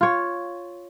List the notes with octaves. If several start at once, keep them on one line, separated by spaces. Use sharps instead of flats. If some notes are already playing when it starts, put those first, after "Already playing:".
F4 C#5